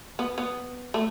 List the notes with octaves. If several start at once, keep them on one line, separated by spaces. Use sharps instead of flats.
B3
B3
A3